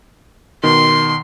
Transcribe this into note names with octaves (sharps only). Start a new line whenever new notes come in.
B2 D#3 C6